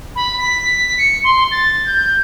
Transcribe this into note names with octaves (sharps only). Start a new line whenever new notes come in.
B5
B6
C#7
C6
A6
G6